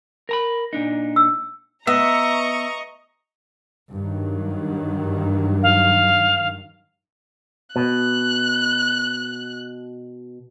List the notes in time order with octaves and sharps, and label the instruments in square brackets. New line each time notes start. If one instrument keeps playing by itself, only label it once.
[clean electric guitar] A#4 A#5 B5
A#2 D4 D#4
[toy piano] E6
[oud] B3 [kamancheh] D#5 [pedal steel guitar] E5 [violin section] A#5 C#6
[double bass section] G2 D#3 F#3
[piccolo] F5
[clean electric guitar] B2 [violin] F#6